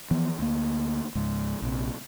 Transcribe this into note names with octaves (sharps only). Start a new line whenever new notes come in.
E3 F3 B3
D2 A#3
C#2 G#2
A#1 C3